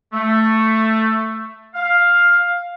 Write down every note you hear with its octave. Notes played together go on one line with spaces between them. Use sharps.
A3
F5